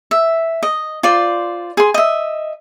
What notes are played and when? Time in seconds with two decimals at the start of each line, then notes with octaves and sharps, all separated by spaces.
0.11 E5
0.63 D#5
1.03 F4 C5 D5
1.77 G#4 C6
1.94 D#5 E5